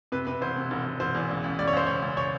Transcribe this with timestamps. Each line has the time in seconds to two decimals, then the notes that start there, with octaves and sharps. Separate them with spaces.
0.12 C3 B4
0.27 C3 B4
0.41 E1 C5
0.56 C3
0.71 E1
0.85 E1
1.00 E1 C5
1.15 E2
1.29 C#2
1.44 C#2
1.59 C#2 D5
1.67 C#5
1.73 C#2 C5
1.86 C#2 C#5
2.02 C#2
2.17 C#5